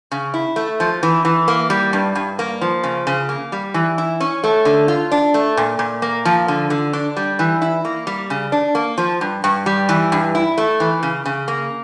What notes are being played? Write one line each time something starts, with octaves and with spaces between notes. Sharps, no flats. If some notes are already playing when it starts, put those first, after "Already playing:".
C#3
E4
A3
F3
E3
E3
A#3
G3
G2
G2
A#3
F3
C#3
C#3
A#3
G3
E3
E4
C#4
A3
D3
F4
D4
A3
A#2
A#2
A#3
F3
D3
D3
D4
G3
E3
E4
A#3
G3
C#3
D4
A#3
F3
G2
G2
G3
E3
G2
E4
A3
E3
C#3
C#3
A#3